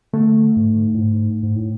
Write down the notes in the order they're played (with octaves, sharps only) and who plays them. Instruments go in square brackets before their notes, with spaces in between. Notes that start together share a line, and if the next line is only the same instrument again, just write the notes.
[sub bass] D3 [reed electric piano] A3
[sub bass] G#2
A2
G#2
G#2
A2